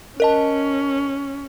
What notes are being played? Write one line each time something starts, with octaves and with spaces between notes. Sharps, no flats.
C#4 A#4 D#5 A5